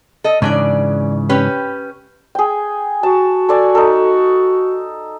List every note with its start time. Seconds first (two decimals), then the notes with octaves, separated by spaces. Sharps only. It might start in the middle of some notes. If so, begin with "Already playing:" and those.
0.24 A4 D#5
0.42 G#2 C#3 E3 C#4 D4 D5
1.29 C#4 G4 B4
2.35 G#4 G5
3.03 F#4 A5
3.49 A4 D5 G#5
3.75 D#4 A4